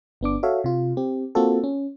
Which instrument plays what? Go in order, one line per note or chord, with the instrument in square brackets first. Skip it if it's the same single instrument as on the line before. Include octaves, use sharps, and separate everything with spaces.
[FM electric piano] G1 B3 D4 D6
F#4 A4 C#5 E5 F5
C3 F4
C4 G4
A#3 C4 F4 F#4 A4
C#4